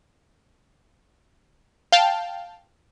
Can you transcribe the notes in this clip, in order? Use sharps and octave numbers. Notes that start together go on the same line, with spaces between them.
F5 G5 A5